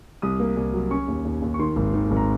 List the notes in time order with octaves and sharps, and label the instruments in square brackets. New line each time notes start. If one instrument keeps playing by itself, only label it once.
[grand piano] C2 D#6
A#3
C2
F#3
C#4 C#6
D#2
D#2
D#2
C#6
D#3 C6
G#1
D#3
G#1
A#5